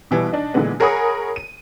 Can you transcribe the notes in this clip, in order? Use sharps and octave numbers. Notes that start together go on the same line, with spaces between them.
B2 E3 G3 B3
D4 D#4
A#2 D3 E3 G#3 B3
G#4 A#4 C#5 F#5 B5 D#6
D#7